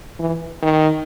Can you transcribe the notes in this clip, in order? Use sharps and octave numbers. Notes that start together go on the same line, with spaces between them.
E3
D#3